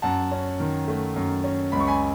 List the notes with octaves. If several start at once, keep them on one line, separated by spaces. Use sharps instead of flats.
F#2 F#5 A5
C#4
D#3
A3
F#2
C#4
C#2 B5
C#6
G#5 B5